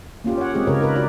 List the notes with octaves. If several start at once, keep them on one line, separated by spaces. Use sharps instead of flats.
A#3 C#4 F4 G4
C#5 F#5
G#3 C4 G4 G#4
C#3 G4 A#4 B4 C#5
D#4 A#4 B4
D#4 F#4 D5